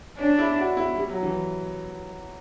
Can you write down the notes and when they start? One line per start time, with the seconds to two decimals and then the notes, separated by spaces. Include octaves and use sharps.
0.18 C#4 D4
0.39 E4
0.58 F#4
0.77 E4
0.96 G3
1.09 F#3
1.23 E3